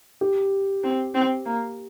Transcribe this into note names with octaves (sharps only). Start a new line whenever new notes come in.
G4
C4
C4
A#3